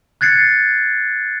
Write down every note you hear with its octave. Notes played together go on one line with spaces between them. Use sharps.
F#6 G#6 A6 C7 C#7